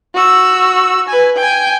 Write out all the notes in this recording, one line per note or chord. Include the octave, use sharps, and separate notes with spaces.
F#4 E6
B4 G#5
G5 G#5